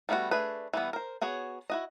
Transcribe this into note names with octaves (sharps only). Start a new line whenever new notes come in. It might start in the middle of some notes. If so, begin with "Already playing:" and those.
G3 A3 B3 F4 F#4
A3 D4 G#4 B4
E3 G3 B3
A#4 C5
B3 F#4 G#4 C#5
E4 F#4 D#5